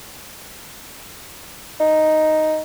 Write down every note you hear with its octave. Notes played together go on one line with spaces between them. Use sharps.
D#4